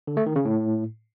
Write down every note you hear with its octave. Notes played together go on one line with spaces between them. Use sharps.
D3
A3
D#3
C#3
A2